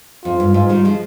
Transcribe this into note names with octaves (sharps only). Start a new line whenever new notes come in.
F2 F4
G2
G#2 F4
D#3 G3
F3 G#3